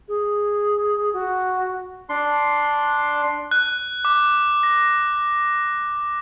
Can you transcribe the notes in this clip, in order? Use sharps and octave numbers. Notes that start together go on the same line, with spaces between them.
G#4
F#4
D4 C6
F#6
D6
A#6